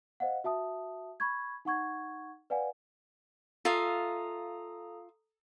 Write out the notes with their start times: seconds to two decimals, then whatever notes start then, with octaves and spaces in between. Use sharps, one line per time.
0.20 C5 D#5 F5 F#5
0.44 F#4 E5 A5 D#6
1.20 B5 C#6 G#6
1.65 D#4 F#5 C#6 G#6
2.50 B4 D5 F5 F#5 G#5
3.65 F4 A4 E5 F5 A#5 D#6